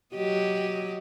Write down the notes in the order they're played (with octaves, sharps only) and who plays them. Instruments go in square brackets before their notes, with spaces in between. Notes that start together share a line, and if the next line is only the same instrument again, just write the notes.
[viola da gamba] F#3 G4 D#5